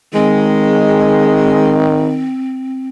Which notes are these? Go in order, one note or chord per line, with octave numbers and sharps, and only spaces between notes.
D#3 G#3 C4